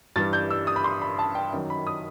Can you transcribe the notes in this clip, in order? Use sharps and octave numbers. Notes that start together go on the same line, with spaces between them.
G2 E3 G3 A6
G6
E6
D#6
B5
C6
B5
A5
G5
F#2 D#3 F#3
B5
D#6